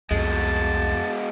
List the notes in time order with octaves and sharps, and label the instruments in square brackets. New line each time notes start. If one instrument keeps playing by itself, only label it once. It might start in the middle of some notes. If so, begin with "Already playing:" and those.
[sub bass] C2 [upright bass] F2 [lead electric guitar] B2 G#3 [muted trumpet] A5